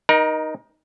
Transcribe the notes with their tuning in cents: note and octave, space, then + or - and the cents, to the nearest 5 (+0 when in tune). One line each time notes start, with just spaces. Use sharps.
D#4 +0 A#4 +30